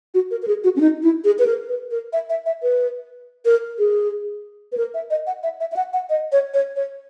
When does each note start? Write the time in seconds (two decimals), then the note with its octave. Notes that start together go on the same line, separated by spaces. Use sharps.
0.14 F#4
0.31 A#4
0.42 A#4
0.48 G#4
0.64 F#4
0.76 C#4
0.80 D#4
1.03 E4
1.25 G#4
1.39 B4
1.46 A#4
1.69 B4
1.91 A#4
2.13 E5
2.30 E5
2.46 E5
2.62 B4
3.45 A#4
3.79 G#4
4.72 B4
4.77 A#4
4.94 E5
5.10 D#5
5.27 F#5
5.43 E5
5.60 E5
5.72 E5
5.76 F#5
5.93 F#5
6.10 D#5
6.32 C#5
6.54 C#5
6.76 C#5